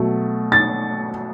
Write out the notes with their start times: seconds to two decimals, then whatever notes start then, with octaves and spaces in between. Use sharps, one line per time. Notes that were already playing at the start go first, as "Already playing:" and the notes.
Already playing: B2 F#3 A3
0.52 A6